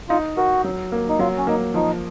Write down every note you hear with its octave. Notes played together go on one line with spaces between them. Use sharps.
D#4 F4
F#4 A#4
F#3
A#3
D#4
F#3 F4
C#4
A#3 D#4
F3 D#4